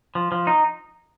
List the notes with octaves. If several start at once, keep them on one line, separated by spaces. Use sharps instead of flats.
F3
F3
D#4